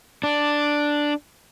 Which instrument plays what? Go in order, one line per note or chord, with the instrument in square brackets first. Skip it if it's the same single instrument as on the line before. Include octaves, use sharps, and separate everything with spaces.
[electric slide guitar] D4